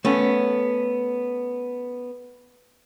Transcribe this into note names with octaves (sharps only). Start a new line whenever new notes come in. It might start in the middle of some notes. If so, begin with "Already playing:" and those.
A3 B3 C#4